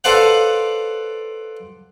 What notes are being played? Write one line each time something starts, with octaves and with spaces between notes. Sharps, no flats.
A4 B4 C5 D5 F5 F#5